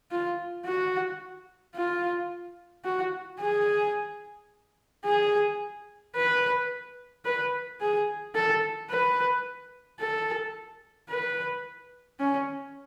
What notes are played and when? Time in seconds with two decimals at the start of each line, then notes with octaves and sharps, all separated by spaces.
0.11 F4
0.66 F#4
1.76 F4
2.85 F#4
3.41 G#4
5.05 G#4
6.16 B4
7.25 B4
7.81 G#4
8.35 A4
8.90 B4
10.00 A4
11.10 B4
12.20 C#4